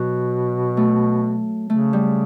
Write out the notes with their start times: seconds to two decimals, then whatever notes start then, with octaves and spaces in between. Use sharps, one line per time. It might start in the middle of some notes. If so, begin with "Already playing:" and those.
Already playing: B2 F#3
0.77 A3
1.69 C#3 A3
1.93 G3